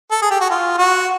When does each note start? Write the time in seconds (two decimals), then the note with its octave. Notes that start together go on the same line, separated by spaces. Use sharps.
0.11 A4
0.22 G#4
0.31 G4
0.41 F#4
0.51 F4
0.78 F#4